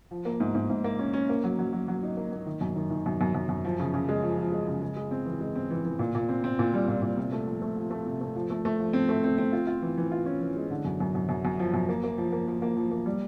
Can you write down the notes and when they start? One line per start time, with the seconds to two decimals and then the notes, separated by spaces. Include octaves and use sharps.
0.11 F3
0.25 A#3
0.40 G#2
0.55 G#2
0.70 G#2
0.84 A#3
0.99 C#4
1.14 C#4
1.29 A#3
1.44 F#3
1.59 F#3
1.73 F#3
1.88 F#3
2.03 D#4
2.17 A#3
2.32 A#3
2.46 D#3
2.61 F#2
2.76 D#3
2.90 D#3
3.06 F#2
3.21 F#2
3.35 F#2
3.49 F#2
3.65 F3
3.80 C#3
3.94 C#3
4.09 G#3
4.23 F3
4.38 F3
4.52 G#3
4.68 C#3
4.81 G#3
4.96 G#3
5.11 C4
5.25 E3
5.41 G#3
5.56 C4
5.70 E3
5.85 E3
5.99 A#2
6.15 A#2
6.29 C4
6.44 C4
6.59 A#2
6.74 G3
6.88 A#2
7.02 A#2
7.17 C3
7.32 A3
7.47 F3
7.62 A3
7.77 F3
7.91 A3
8.06 C3
8.21 A3
8.36 F3
8.50 A3
8.65 A3
8.80 F3
8.93 C4
9.09 A3
9.24 C4
9.38 C4
9.52 F4
9.67 F4
9.82 E3
9.98 E3
10.12 F4
10.26 C#4
10.41 E3
10.56 G#3
10.70 D3
10.85 F#2
11.00 F#2
11.15 F#2
11.29 F#2
11.45 F#2
11.59 F3
11.74 F#2
11.89 A#3
12.04 A#3
12.18 F3
12.32 A#3
12.48 F3
12.62 A#3
12.76 F3
12.91 A#3
13.06 G3